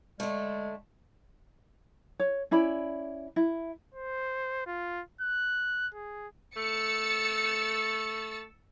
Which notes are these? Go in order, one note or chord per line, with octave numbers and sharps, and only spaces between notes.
D3 G#3 A3
C#5
C#4 E4 D5 B5
E4
C5
F4
F#6
G#4
A3 E6 A6 C#7